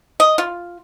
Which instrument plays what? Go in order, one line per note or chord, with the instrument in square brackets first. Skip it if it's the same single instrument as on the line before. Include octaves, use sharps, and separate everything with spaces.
[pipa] D#5
F4